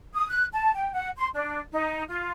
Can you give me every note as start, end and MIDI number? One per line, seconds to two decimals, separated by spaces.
0.15 0.26 87
0.28 0.45 90
0.52 0.71 81
0.74 0.92 79
0.93 1.08 78
1.17 1.27 84
1.33 1.59 62
1.72 2.01 63
2.08 2.32 65